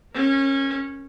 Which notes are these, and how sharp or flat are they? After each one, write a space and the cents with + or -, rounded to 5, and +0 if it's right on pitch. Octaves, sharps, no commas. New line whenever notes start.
C#4 -20 A#4 +0